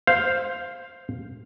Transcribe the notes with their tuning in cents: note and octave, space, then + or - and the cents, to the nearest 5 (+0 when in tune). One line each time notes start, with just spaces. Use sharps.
C5 +0 F5 +0